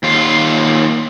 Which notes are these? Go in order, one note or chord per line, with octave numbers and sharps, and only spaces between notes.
D#2 F4